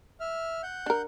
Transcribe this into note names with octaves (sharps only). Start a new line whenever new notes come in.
E5 F6
F#5 G6
D4 A#4